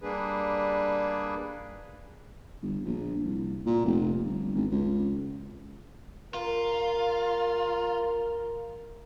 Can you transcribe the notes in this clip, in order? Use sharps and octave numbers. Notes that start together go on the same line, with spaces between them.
G3 A#3 D4 G#4 B4
G1
A#1
C2
A#2
F1
G1
G#1
C#2
F4 A#4